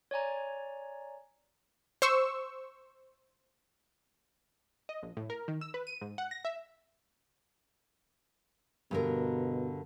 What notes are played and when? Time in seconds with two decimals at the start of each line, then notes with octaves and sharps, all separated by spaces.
0.11 C#5 D5 G#5 A#5
2.02 C5 C#6 E6
4.89 D#5
5.03 A#1
5.17 A2
5.30 A#4
5.48 D#3
5.61 E6
5.74 B4
5.87 D#7
6.02 G#2
6.18 F#5
6.31 A#6
6.45 E5
8.91 G2 B2 D3 A#4